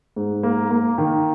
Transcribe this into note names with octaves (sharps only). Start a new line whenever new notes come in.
G#2
A#3
A#3
D#3